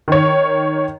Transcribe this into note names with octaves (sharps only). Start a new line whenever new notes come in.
D#3 C#5